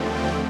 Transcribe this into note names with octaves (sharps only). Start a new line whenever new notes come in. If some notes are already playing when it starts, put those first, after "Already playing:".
Already playing: D#2 D3 F3 A3 C4 G5